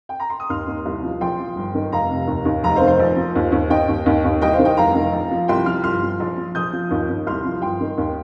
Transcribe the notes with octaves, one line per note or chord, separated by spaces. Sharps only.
G5
A#5
C6
D#6
D#2 C6 F6
D#2
C2
F3
A#1 G5 C6
F3
G1
D#3
F1 F5 A#5
C3
D#2
D#2
F1 F5 A#5
C5 F5
D#3
C5
A#1
F3
D#2
D#2
D#2 D#5 G5
D#2
D#2
D#2
C2 D#5 G5
C5 F5
D#3
D#5 G5
F1 F5 A#5
D#3
A#1
F3
C2 G5 C6
F3 C6 F6
G1 C6 F6
F3
A#1
F3
A#1 D#6 G6
F3
D#2
D#2
C2 C6 F6
F3
G1 G5 C6
D#3
D#2